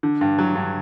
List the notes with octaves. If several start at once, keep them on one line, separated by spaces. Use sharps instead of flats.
D3
G2
F#3
G2